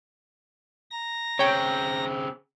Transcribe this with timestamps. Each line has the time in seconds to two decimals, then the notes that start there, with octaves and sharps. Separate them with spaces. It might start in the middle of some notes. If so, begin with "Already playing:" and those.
0.91 A#5 A#6
1.39 C#3 C4 C#5 G5